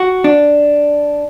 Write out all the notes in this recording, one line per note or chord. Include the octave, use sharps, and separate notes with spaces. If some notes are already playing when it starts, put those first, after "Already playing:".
Already playing: F#4
D4